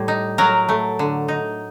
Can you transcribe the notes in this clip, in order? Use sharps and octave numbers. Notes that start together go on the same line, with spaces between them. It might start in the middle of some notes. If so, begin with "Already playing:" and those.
Already playing: A2 G3
D#4
F#3 A#4
A3
D3
D#4